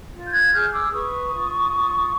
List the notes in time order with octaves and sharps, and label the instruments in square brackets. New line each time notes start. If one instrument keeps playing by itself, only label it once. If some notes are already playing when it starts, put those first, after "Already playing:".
[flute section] F4
G6
F#6 G#6
G#4 F6 G6
D6 E6
B4 C#6 D#6
F4
F4